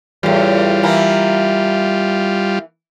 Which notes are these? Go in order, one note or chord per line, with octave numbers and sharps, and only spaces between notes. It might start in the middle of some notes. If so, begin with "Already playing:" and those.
E2 A2 G3 F4
E3 A#3